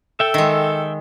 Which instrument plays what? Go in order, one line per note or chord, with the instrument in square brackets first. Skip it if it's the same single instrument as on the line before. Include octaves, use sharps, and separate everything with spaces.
[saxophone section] A4 [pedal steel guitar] E5 G5
[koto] D#3 G#3